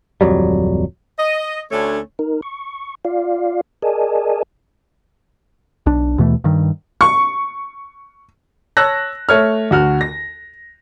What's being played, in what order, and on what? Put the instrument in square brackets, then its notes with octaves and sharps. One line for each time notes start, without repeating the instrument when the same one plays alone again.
[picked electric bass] D1 F2 F#3 G3
[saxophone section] D#5
D2 A3 C#4 D4 C#5
[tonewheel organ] D#4 A#4
C#6
F4 D5 F5
G#4 A#4 D5 D#5 G#5 A5
[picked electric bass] B1 D4
D#2 B2 E3 A3
G2 D#3
[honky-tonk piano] C#6
[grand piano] C#5 A5 E6 F#6 A#6
A3 C#5 F6
D2 F#4 F6
A#6